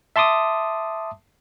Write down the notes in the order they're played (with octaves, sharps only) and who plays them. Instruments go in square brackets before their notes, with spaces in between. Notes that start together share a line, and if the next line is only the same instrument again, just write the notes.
[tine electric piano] E5 A5 C6 D6 D#6